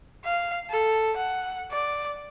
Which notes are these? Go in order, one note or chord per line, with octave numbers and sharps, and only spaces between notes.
F5
A4
F#5
D5